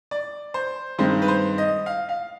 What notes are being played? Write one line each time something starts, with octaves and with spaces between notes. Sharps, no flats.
D5
C5
G2 D#3 G#3 C4 C5
B4
C5
D#5
F5
F5